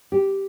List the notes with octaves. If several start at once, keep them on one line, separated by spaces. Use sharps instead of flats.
G4